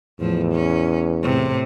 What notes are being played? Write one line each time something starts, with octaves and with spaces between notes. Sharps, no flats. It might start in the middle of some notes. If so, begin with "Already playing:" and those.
E2 A2 F3
C#4
A2 C3